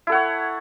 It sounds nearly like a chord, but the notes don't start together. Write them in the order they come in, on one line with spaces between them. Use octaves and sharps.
E4 A4 F#5 C#5